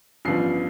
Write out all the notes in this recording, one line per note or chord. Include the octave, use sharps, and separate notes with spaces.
A1 G2 F3 B3 C7